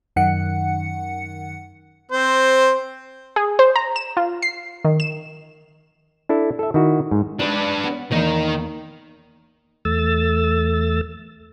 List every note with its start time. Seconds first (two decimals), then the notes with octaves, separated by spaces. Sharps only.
0.16 F#2 D#3 F#5 C#7
2.11 C4 C5
3.36 G#4
3.59 C5
3.76 A#5
3.96 E7
4.17 F4
4.42 C7
4.85 D#3
5.00 E7
6.29 D4 E4 A4
6.59 A4 E5
6.74 D#3 E4 F#4
7.11 G#2
7.39 G#3 D4 B4 D5
7.84 B3
8.11 E2 D#3 A#3 D#4 C#5
9.85 E2 A3 E6 A6